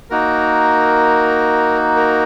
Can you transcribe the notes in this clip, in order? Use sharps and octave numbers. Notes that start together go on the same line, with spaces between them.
A#3 D#4 F#4 A#4
A#4